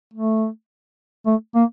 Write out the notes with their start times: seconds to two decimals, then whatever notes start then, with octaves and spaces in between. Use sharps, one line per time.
0.14 A3
1.26 A3
1.55 A#3